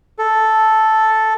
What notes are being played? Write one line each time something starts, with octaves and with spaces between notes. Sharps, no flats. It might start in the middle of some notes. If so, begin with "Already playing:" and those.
A4